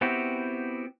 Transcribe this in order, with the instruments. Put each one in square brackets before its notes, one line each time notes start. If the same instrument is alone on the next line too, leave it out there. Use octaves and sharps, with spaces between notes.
[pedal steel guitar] B3 C4 E4 F#4 G4